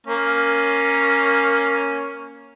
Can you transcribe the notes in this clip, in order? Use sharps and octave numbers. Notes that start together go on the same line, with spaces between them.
A#3 C#4